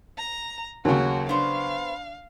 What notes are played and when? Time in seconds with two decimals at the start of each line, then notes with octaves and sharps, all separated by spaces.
0.18 A#5
0.85 D#2 C#3 F#3 F#4
1.29 B3 D4 C5 F5